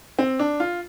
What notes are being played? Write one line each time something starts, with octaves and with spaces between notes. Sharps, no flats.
C4
D4
F4